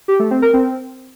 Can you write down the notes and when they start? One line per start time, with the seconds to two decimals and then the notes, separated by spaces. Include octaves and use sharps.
0.08 G4
0.19 A3
0.31 C4
0.42 A#4
0.54 C4